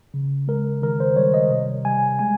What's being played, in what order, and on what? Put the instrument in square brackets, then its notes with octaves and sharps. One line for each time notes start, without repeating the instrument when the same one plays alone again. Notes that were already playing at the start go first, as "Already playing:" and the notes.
[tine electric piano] C#3
G#3 A#4
D#3 A#4
C5
G3 C#5
D#5
C3
G3 G#5
G#3 G#5